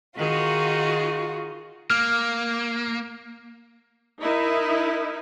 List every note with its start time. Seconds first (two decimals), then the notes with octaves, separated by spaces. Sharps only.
0.17 D#3 D#4 F4 F#4 G#4
1.90 A#3 F6
4.20 D#4 E4 A#4